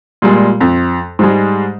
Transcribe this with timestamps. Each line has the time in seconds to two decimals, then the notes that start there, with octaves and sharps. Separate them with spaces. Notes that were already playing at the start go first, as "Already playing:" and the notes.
0.22 A#2 G3 G#3
0.61 F2
1.19 G#2 G3 G#3